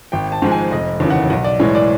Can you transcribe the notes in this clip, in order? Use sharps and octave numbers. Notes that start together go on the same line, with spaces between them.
G#1 G5
A5
G#2 F3 G#3
G#5
F1 D#5
D#2 C#3 E3
F#5
B1 F#5
D5
A2 E3 G#3 C#5
D5